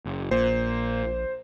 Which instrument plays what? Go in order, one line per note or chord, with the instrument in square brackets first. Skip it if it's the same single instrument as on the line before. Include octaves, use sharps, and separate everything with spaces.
[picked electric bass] F#1
[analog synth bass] A#1 [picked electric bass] A#2 [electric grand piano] C5